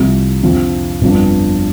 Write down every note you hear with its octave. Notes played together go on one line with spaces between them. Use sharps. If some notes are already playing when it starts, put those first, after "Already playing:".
Already playing: C2 C3 F3
F2 D3 F3 C4
G1 F2 F3 D4